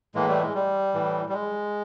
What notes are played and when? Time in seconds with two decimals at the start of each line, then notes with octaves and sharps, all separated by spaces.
0.15 A2 E3 G#3 A#3
0.29 G3 A3
0.41 G#3
0.55 G3
0.94 A2 E3
1.29 G3
1.33 G#3